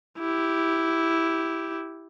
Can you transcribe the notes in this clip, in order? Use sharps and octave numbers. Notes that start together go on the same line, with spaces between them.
E4 G4